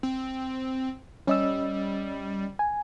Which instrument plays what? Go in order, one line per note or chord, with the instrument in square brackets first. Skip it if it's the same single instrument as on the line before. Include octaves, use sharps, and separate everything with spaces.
[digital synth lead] C4
[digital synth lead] G3 [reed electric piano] C#4 D#5 E6
[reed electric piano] G#5